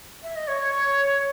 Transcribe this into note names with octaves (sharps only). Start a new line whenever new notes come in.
E5
D#5
C#5